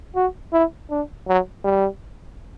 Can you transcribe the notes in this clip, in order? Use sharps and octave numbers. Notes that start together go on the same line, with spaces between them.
F#4
E4
D4
F#3
G3